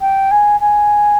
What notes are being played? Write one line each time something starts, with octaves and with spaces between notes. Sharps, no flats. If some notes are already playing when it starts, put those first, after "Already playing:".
G5
G#5
G#5